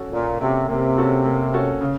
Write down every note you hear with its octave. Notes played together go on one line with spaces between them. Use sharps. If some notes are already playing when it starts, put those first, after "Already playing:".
Already playing: C#4 F#4 A4
A#2 A#3
C3 C#4 F#4 A4
C3 A#3
C#4 F#4 A4
A#3
C#4 F#4 A4
C#3